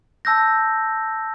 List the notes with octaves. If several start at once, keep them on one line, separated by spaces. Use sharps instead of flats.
A5 E6 G6 A#6